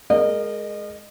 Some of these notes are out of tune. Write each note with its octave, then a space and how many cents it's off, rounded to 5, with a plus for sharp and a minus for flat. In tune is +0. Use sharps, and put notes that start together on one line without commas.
G#3 +15 A#4 +0 D#5 -30